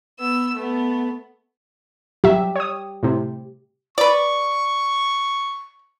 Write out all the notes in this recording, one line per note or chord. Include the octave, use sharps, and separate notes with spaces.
B3 E6
A3 B3
F#3 G4 E5
C#5 D#6
A2 C3
B4 D5 C#6